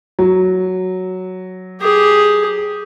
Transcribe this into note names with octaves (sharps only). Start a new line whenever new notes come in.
F#3
G4 G#4